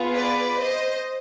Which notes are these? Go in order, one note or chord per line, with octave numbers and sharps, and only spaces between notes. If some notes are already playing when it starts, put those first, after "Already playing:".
Already playing: B3 F4 G#4
B4 D5
C5 D#5